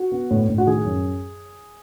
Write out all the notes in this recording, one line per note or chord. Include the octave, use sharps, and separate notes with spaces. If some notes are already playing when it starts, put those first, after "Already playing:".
Already playing: F#4
B3
A2
A2
F#4
D#3 G#4
F#2